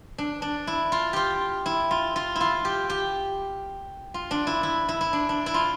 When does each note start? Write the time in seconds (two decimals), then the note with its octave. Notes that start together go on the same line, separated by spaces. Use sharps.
0.18 D4
0.42 D4
0.67 E4
0.92 F4
1.13 F4 G4
1.66 E4
1.91 F4
2.16 F4
2.36 E4
2.41 F4
2.65 G4
2.90 G4
4.14 F4
4.31 D4
4.47 E4
4.63 E4
4.89 E4
5.01 E4
5.13 D4
5.29 D4
5.46 E4
5.54 F4